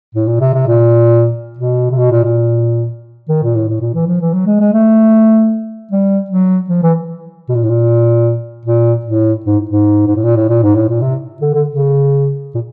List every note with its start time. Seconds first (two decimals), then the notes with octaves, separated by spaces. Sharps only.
0.15 A2
0.27 A#2
0.40 C3
0.54 C3
0.67 A#2
1.58 B2
1.91 C3
1.97 B2
2.11 A#2
2.24 A#2
3.28 D#3
3.42 A#2
3.55 A2
3.68 A2
3.81 A#2
3.94 E3
4.07 F3
4.21 E3
4.33 F#3
4.46 G#3
4.60 G#3
4.73 A3
5.91 G3
6.30 F#3
6.69 F3
6.83 E3
7.49 B2
7.55 A#2
7.63 A2
7.69 A#2
8.65 A#2
9.05 A2
9.45 G#2
9.69 G#2
10.07 G#2
10.15 A2
10.23 A#2
10.36 A2
10.49 A#2
10.63 G#2
10.75 A2
10.89 A#2
11.01 C3
11.41 D3
11.54 D3
11.68 C#3
12.54 A#2